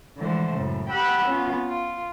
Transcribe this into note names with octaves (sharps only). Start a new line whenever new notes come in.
D3 E3 F3 G#3 A3 C5
F#2 A2 C#3
G4 F#5 G5 B5 E6 F#6
B3 C#4 F4
F4